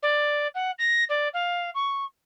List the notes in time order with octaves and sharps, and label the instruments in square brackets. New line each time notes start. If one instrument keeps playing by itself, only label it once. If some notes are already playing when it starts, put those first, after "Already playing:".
[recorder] D5
F#5
A#6
D5
F5
C#6